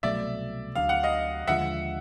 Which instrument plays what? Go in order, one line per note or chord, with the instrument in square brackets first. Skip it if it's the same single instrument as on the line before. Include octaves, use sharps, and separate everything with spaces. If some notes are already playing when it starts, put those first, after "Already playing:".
[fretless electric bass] C2 B2 F#3 A3 [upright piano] D5 E5
[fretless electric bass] D2 D3 F#3 [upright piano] F5
[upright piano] F#5
D#5 F5
[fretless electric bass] D#2 D3 F3 G#3 [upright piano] E5 F#5